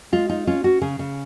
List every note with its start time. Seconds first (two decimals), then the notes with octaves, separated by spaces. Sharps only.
0.12 G#3 F4
0.29 D#4 F4
0.47 C#4 F4
0.64 C#4 F#4
0.81 C#3 G#4
0.99 C#3